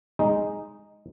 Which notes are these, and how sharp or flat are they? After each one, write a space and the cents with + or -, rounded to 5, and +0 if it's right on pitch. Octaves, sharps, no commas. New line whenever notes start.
G#3 -10 D#4 +0